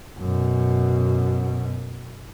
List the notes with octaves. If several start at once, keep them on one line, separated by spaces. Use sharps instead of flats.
F#2 B2